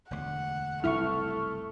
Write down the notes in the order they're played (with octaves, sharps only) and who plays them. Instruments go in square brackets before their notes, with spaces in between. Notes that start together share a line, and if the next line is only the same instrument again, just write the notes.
[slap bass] E1 D2 [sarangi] F#5
[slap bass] F#1 C2 G2 [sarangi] A3 [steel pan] E4 [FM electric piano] C#6 F6